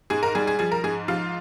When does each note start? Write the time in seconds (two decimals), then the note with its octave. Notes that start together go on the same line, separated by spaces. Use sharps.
0.10 G#2 G#4
0.23 A#4
0.35 G3 G#4
0.47 G#4
0.59 F3 G#4
0.72 A#4
0.84 G#2 G#4
1.08 F3 F4